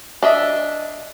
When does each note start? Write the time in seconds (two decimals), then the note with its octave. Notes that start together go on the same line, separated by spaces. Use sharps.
0.23 D4 D#5 E5